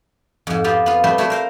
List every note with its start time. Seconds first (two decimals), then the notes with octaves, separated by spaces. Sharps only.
0.47 F2 G#2
0.64 B3 C4 D#4 F4 G4
0.86 B3 F4
1.04 G3 A3 B3 C4 B4 C5
1.18 A3 E4 A4 B4 C5
1.30 A#4 C5 F5